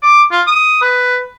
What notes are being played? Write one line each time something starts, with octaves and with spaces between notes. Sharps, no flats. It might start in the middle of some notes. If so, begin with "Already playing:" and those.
D6
F4
D#6
B4